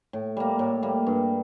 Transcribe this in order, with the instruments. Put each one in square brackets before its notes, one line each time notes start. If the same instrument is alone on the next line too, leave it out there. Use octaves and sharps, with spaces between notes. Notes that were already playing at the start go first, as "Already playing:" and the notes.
[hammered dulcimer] A2
G3 A#3
A2
G3 A#3
G2